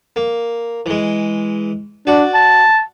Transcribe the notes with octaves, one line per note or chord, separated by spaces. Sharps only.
A#3
E3 G#3
D4 F#4 D5
A5